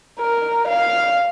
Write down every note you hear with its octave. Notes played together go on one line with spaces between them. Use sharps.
A#4
F5